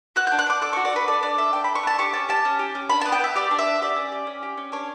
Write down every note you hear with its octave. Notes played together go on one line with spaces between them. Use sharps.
F#4 F#6
D4 G6
F#6
D4 D6
A4 D6
F#4 C#6
D5
D4 B4
A4 D5
D4 D5
A4 E5
D4 G5
A4 B5
C#6
D4 A5
G4 C#6
C#4 A5
G4 A5
C#4
G4
C#4
D4 B5
B3 A5
G5
B3 E5
G4 D5
D4
E5
B3
G4 D5
C#4
G4
C#4
G4
C#4
D4 C#5